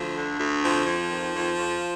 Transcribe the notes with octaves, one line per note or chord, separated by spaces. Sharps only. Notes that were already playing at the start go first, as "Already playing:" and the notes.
Already playing: D2 F3
D3
D2
F2 F3
F2
D#3
F2
F2